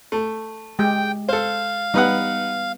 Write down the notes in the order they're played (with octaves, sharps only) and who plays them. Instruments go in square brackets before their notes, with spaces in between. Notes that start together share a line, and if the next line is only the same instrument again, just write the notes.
[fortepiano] A3
[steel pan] G#3 G4 [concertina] G5
[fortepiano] A4 C5 [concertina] F5
[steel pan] G3 B3 [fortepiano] D#4 B4 F#5